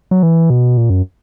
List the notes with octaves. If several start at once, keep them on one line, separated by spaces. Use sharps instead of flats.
F#3
E3
B2
A#2
F#2